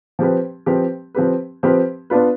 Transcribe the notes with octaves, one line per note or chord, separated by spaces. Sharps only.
F3 C4 G4 B4
F3 C4 G4 B4
F3 C4 G4 B4
F3 C4 G4 B4
B3 D4 F4 B4